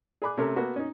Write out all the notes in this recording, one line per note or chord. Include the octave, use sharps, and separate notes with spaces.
G#4 D5 B5 D6 F#6
C3 A3 C#4 A4 A#4
A#3 B3 F#4 A4
C#4 D#4